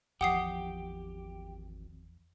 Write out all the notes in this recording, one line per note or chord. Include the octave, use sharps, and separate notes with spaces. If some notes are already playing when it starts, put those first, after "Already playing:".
G#1 E2 F3 G4 F#5 D#6 C7